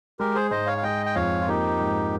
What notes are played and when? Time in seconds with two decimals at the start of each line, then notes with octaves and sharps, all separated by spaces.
0.20 G#3 G4 A#4
0.35 G#4 C5
0.51 G#2 C5 D#5
0.67 C#5 F5
0.78 F5
0.83 G#3 D#5 G5
1.06 G5
1.15 F2 C#5 F5
1.41 F4
1.48 A#3 D#4 G4
1.80 G#2